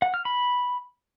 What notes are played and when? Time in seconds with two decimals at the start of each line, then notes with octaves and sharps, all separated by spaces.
0.02 F#5
0.14 F6
0.25 B5